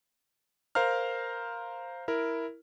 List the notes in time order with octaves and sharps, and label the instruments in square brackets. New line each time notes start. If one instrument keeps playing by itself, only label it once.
[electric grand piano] A#4 C5 F5 A#5 F6
E4 A#4